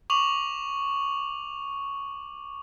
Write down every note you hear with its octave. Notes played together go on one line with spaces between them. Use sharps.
C#6 D6 F7 F#7